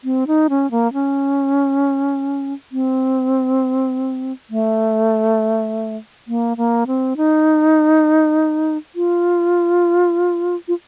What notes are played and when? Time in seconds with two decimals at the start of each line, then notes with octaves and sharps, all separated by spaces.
0.04 C4
0.27 D#4
0.50 C#4
0.71 A#3
0.93 C#4
2.72 C4
4.50 A3
6.28 A#3
6.57 A#3
6.87 C4
7.17 D#4
8.96 F4
10.68 F4